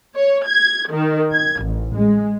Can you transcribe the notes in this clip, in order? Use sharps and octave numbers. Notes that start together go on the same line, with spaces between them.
C#5
G#6
D#3
G#6
A1
G#3